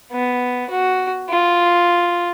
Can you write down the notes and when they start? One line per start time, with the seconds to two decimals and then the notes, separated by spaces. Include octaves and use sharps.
0.12 B3
0.70 F#4
1.30 F4